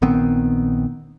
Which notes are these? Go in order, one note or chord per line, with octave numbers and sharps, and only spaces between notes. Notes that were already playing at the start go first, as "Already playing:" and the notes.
A#1 D#3 B3 C4